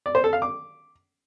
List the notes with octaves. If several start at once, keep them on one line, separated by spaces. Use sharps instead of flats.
D5
C5
A4
F5
D6